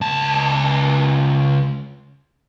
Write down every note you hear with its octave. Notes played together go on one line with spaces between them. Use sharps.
C#2 A5